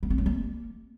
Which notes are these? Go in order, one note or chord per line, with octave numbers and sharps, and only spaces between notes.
B3
C4
F#3
A#3